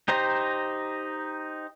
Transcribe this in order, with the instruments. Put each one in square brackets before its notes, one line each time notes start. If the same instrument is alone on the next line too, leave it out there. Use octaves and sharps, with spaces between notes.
[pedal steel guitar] D#4 G4 C5 A#5